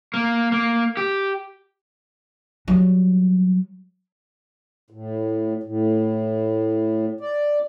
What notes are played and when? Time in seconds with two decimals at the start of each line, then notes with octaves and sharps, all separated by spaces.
0.14 A#3
0.52 A#3
0.97 G4
2.68 F#3 G3
4.90 A2
5.63 A2
7.20 D5